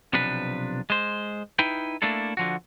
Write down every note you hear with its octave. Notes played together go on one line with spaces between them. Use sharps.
B1 C3 F3 D4 B4
G#3 C5
D#4 E4 B4 G5
A3 A#3 D4 E4 A4
D3 F3 F#4